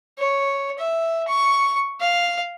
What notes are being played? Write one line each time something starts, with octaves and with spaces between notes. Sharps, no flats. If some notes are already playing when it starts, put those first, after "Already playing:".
C#5
E5
C#6
F5